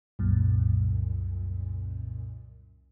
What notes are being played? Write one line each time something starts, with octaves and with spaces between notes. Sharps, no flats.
C2 F#2 A#2